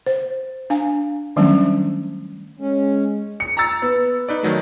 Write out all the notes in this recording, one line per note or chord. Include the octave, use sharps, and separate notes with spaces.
C5
D4 F5 G#5
D#3 F#3 G3 A3 C#4 D4
G#3 C#4
C#7
A#5 E6 A6
B3
D#4 B4 D5
D#3 F#3 A3